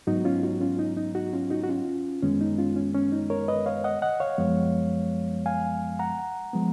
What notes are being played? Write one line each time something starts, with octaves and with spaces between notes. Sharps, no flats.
G#2 F#3 B3 D#4 F#4
C#4 F4
D#4 F#4
C#4 F4
D#4
D#4
D#4 F#4
C#4 F4
D#4 F#4
F#4
C#4 F4
F#2 D#3 G#3 B3 C#4
D#4
C#4 F4
C#4
C#4
D#4
A#4 C#5
B4 D#5
C#5 F5
D#5 F#5
D#5 F#5
C#5 F5
F#2 F3 G#3 B3
F5 G#5
F#5 A#5
F3 G#3 B3